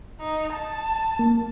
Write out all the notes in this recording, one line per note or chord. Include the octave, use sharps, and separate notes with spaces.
D#4
A5
A#3